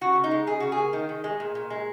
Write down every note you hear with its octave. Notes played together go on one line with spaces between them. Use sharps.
C#3 F#4
C#3
D#4
G#3
C#3 G#4
C#3 F#4
G#4
A#3
D#3
D#3
G#3
A#2
A#2
G#3